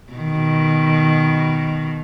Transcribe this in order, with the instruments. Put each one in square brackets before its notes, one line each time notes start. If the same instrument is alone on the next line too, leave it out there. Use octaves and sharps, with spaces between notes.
[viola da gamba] B2 D#3